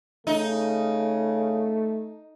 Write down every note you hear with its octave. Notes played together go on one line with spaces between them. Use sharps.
C#3 A3 D#4